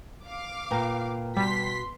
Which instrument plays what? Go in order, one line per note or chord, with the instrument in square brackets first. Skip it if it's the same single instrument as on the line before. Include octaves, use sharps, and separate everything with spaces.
[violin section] F5 D6
[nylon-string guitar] A#2 [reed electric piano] B4 G5 A#5
[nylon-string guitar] B2 [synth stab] G3 [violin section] C6 B6